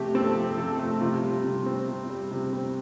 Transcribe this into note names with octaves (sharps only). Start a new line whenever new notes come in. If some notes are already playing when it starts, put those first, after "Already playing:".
Already playing: C3 F3 A3 G4
C4 A4
F3
C3 A4
A3
C3 F4
G3
C3
C4
C3
G3
C3
C4